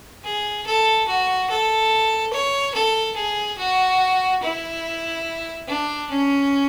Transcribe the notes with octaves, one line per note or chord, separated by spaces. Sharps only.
G#4
A4
F#4
A4
C#5
A4
G#4
F#4
E4
D4
C#4